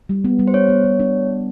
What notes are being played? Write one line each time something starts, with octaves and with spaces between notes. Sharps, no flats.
G3
B3
G3
C5
D4 C#5
B3
G3
D4